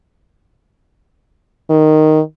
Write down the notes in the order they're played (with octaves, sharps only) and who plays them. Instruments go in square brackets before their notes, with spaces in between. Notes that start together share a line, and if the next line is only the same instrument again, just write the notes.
[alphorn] D#3